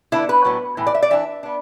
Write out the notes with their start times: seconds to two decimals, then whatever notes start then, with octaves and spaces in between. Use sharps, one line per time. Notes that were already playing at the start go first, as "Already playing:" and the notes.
0.12 D3 B3 D4 E4
0.29 B4
0.45 A2 F#3 B3
0.77 A2 E3
0.87 D5
0.95 E5
1.02 D5
1.10 E3 D4 E5
1.43 B3 D4